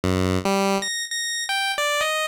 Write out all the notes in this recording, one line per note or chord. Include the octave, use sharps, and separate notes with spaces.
F#2
G3
A#6
A#6
G5
D5
D#5